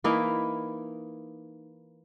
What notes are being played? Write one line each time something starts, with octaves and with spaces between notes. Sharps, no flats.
E3 A#3 D#4 E4